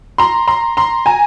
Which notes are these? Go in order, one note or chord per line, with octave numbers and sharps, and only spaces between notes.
A#5 C6
A#5 C6
A#5 C6
G#5 A#5